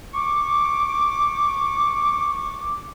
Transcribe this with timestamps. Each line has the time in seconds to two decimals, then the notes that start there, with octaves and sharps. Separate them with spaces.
0.14 C#6 D6